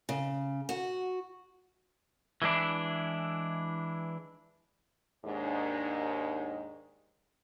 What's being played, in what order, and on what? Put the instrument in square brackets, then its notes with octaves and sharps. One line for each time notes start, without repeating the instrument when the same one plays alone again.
[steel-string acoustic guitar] C#3
F#4
[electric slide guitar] E3 G#3 B3 D4 E4
[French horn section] D#2 G#2 D4